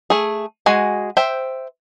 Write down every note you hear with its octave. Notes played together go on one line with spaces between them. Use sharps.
A3 G#4
G#3 F#4 G#5
C5 E5 G5